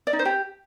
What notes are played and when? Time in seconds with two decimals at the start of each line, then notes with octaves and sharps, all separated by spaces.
0.07 D5
0.13 D#4
0.19 C5
0.25 G4